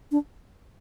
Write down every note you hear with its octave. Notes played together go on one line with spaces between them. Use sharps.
D4